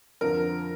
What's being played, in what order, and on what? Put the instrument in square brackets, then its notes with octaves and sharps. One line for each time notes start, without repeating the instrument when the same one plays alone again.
[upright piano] F2 D3 F3 A#4